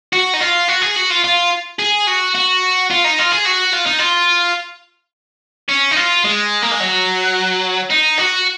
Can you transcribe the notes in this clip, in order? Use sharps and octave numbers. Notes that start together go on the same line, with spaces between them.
F#4
D#4
F4
F#4
G#4
F#4
F4
F4
G#4
F#4
F#4
F4
D#4
F4
G#4
F#4
F4
D#4
F4
C#4
D#4
F4
G#3
A#3
G#3
F#3
D#4
F#4